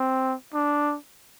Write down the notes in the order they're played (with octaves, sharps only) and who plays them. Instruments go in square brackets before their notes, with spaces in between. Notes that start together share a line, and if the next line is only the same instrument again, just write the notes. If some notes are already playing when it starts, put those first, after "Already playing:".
Already playing: [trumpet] C4
D4